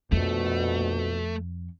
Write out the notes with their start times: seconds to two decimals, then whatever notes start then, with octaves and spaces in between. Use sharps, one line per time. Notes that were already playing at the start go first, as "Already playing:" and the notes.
0.12 A#1 F2 B2 A3